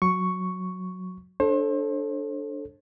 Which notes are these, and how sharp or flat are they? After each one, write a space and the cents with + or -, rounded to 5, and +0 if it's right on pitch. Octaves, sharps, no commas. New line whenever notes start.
F#3 -10 C#6 +0
D4 +0 A4 +0 C5 +40